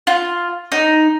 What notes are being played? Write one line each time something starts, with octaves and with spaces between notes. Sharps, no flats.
F4
D#4